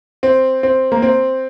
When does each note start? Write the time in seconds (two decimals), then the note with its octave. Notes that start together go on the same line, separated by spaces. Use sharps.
0.23 C4
0.63 C4
0.92 A#3
1.02 C4